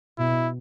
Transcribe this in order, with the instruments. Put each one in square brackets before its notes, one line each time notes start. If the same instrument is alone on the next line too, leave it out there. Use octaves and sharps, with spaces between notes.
[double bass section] B2 [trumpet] E4